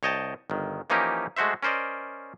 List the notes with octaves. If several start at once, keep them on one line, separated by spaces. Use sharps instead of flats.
C2 C#5 D#5 G5 A5
G1 D#3
E3 F3 A#3 C#4 D#4 G4
G#3 A3 F#4 C5 E5
C#4 A#4 C5 D5 D#5